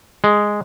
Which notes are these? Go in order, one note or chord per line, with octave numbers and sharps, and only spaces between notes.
G#3